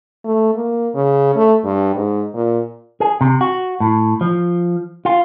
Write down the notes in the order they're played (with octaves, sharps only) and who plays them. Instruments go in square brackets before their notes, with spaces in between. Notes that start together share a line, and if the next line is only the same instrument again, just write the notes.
[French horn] A3
A#3
C#3
A3
G2
G#2
A#2
[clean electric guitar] G#4
C3
F#4
A2
F3
F4